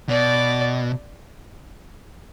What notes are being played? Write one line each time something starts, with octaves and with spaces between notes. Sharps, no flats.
B2 D5